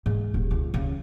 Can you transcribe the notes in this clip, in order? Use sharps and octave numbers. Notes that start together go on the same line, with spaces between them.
G#2
D#1
C#2
C#3